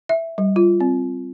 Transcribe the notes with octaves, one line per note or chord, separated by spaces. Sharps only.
E5
G3
F4
C4